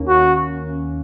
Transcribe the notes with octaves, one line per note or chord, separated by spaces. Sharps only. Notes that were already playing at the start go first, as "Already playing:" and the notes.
Already playing: D#2 D#3 A#3 C#4
F#4